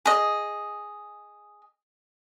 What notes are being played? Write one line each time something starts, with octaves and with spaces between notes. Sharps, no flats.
G#4 D#5